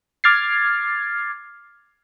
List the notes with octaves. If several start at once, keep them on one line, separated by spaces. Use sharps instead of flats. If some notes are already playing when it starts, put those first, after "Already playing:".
D6 F6 G#6 A6 C7